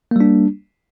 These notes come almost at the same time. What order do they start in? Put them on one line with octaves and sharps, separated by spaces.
A#3 G3 D4